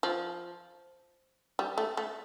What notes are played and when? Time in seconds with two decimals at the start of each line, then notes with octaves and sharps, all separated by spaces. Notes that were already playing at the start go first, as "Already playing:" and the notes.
0.03 F3
1.59 G3
1.78 A3
1.97 A3